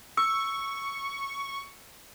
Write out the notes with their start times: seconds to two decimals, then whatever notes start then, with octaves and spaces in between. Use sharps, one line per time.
0.17 C#6 E6